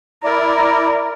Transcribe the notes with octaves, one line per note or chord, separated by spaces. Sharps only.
E4 A#4 D5